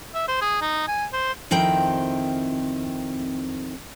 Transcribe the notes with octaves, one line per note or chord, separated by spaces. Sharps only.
E5
C5
G#4
D#4
G#5
C5
F2 D#3 C4 E4 G5 A#5